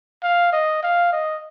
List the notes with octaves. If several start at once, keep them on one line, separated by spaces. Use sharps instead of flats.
F5
D#5
F5
D#5